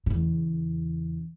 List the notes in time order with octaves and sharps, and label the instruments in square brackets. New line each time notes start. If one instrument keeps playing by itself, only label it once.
[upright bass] E2 C#3